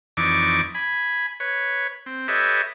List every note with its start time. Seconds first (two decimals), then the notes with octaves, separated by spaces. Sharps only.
0.17 F2 E3 D#4 D5 C#6 D6
0.75 G#5 B5
1.40 B4 C#5
2.06 C4
2.28 G4 A4 B4 C#5 D#5 E5